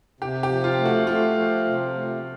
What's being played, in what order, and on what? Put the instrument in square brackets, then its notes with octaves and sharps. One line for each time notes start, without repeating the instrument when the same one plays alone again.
[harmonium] C3 [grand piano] G4
[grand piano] G4
[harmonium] F3
[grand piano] F4
[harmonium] A3
[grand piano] F#4
[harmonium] A3 [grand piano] F4
[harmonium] F3
C3
A3